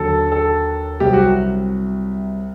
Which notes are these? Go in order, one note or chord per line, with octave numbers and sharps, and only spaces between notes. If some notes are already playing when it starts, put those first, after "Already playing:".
Already playing: D#2 D3 F#3 A4
A4
C2 C3 F#3 G4
F#4